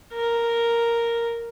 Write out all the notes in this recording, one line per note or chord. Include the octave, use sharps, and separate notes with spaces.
A#4